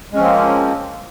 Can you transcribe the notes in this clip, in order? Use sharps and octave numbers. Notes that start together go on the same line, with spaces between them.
F3 G#3 A#3 C4 C#4